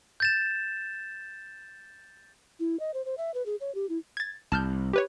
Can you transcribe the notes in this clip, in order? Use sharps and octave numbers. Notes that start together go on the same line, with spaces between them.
G6 A6 E7
E4
D#5
C5
C5
E5
B4
G#4
C#5
G4
E4
G#6 A6
C2 A5 F6 G6
G4 B4 C#5